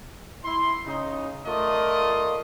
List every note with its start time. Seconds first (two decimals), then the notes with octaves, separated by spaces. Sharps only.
0.44 E4 C6
0.86 C#3 D#4
1.46 A3 F4 A#4 D5 D#5 F5